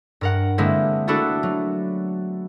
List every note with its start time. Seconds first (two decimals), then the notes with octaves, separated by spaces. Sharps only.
0.21 G2 A#4 F#5
0.58 D3 G#3 A#3 C4 E4
1.07 A3 B3 D4 E4 F#4 A4
1.43 F#3